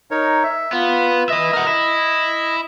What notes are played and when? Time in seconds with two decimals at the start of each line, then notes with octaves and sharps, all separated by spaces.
0.11 D#4 A#4 C#5
0.43 E5
0.73 B3 F4
1.29 B4 D#5 E5
1.53 A#4 F#5
1.67 E4